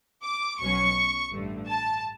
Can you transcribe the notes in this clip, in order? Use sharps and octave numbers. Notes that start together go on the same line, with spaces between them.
D6
B1 B2 F#3 C#4 C#6
A1 G2 D3 A3
A5